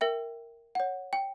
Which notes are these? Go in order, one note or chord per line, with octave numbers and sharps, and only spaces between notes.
A#4 E5 G5
C#5 F#5
G5